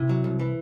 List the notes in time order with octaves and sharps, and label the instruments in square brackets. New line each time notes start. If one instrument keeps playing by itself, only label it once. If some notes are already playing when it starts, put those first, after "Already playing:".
Already playing: [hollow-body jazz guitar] C3 [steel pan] E4
[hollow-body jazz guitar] F#3
C2
E3